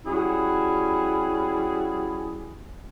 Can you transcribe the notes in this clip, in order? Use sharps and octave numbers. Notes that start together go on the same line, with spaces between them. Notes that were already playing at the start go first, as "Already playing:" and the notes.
G3 C#4 E4 F#4 G#4